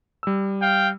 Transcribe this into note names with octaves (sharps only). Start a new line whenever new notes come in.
G3 E6
F5 G5